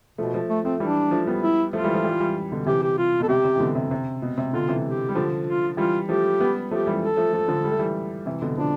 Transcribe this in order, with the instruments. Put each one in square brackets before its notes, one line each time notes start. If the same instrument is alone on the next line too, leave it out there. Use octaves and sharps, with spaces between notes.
[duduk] B2 [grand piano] F3 A3
[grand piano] F3 A3
[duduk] A3
[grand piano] F3 A3 [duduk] C4
[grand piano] E3 G3 [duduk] D4
[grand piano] F3 A3
G3 B3
[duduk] E4
[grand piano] F3 A3 [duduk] F4
[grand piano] E3 G3
F3 A3
E3 G3
E3 G3
B2 D3
[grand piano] C3 E3 [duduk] G4
[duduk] G4
F4
[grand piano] B2 [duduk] A4
[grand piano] C3 [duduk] G4
[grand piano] C3
E3
B2 D3
C3
C3
B2
C3
[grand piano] B2 D3 [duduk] F4
[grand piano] C3 E3
[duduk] G4
[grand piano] G3
D3 F3
[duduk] F4
[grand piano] E3 G3 [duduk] F4
[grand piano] F3 A3 [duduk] G4
[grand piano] G3 B3
[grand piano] F3 A3 [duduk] G4
[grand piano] E3 G3
[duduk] A4
[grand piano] F3 A3
F3 A3
D3 F3
G3
A3
E3 G3
C3 E3
B2 D3
[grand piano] D3 F3 [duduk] D4